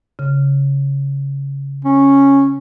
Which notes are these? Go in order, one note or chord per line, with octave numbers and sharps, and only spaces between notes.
C#3
C#4